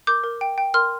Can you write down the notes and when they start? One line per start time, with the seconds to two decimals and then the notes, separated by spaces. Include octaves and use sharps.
0.07 A#4 D6 G6
0.24 A#4
0.41 G5
0.58 G5
0.74 A#4 C6 F6